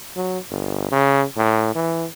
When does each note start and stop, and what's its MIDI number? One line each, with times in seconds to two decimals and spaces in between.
0.16 0.39 54
0.50 0.92 31
0.92 1.24 49
1.36 1.71 45
1.75 2.06 52